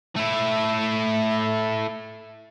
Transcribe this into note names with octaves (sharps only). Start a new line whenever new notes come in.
A3 E4